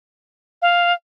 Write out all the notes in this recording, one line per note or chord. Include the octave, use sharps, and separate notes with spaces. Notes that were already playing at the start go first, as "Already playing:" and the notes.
F5